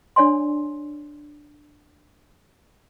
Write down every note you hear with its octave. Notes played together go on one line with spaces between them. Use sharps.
D4 C#5 D5 G#5 C6